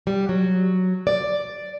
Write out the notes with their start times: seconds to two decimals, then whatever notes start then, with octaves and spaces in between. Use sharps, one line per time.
0.07 G3
0.29 F#3
1.07 D5